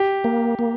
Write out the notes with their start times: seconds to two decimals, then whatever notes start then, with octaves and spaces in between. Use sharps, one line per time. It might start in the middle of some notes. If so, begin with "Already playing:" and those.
Already playing: G4
0.24 A#3
0.59 A#3